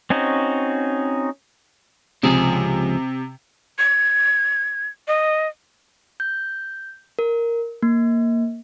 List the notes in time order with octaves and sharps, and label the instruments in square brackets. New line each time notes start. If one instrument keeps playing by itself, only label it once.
[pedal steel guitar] C4 C#4 D#4 F#4
[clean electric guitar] C#2 F3 G#4 [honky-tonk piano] C3
[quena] G#6
D#5
[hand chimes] G6
A#4
A#3